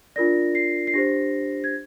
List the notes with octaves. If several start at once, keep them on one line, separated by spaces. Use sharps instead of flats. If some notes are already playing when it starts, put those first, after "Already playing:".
D4 F4 A#4 D5 A#6
C7
C7
D4 G4 C5 A#6
G#6